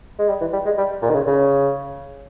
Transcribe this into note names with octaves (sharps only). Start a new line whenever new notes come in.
G#3
G3
E3
G3
G#3
G3
A#2
D#3
C#3
C#3